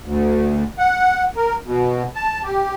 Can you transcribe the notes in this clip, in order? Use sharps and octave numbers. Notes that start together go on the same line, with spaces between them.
D2
F#5
A#4
B2
A5
G4